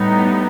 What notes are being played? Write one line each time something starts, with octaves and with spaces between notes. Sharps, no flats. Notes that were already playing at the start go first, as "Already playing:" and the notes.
Already playing: A2 G3 B3 D#4